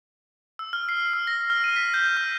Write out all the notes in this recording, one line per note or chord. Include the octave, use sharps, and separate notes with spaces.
E6
F6
C7
E6
A#6
F6
D#7
B6
G6
F6